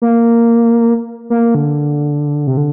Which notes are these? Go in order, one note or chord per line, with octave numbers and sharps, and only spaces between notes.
A#3
A#3
D3
C3
D3